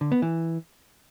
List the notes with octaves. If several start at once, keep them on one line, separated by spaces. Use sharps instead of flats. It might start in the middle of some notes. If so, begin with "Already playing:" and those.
D3
B3
E3